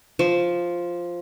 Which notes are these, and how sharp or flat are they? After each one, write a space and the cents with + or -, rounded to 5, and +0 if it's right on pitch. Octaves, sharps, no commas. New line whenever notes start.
F3 +0